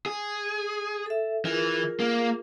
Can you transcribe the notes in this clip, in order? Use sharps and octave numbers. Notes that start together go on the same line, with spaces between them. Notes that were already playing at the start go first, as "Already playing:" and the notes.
G#4
A4 E5
E3 F4 G#4 A#4
A#3